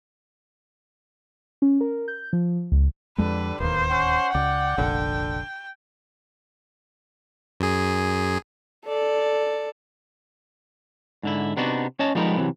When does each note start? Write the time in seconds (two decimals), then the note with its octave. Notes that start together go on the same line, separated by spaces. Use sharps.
1.62 C#4
1.81 A#4
2.08 G6
2.33 F3
2.72 C#2
3.18 F2 D3 G3 G#3 B4
3.60 D1 D#2 A#3 B3 C5
3.91 C#4 F#5
4.35 C#2 D5 G5
4.78 F1 A#1 D3
7.60 F#2 G#4
8.86 A4 D5
11.23 G#2 D3 E4
11.57 C3 B3 D4 D#4 F#4
11.99 C#4 C#5 D#5 A5
12.15 F3 G3 G#3 B3 D#4 A#4
12.38 C3 E3 F#3